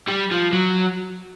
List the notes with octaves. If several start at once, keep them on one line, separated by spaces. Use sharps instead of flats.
G3
F3
F#3